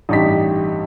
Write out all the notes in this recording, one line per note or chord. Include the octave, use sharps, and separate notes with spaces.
A1 G2 D#4 G4 B6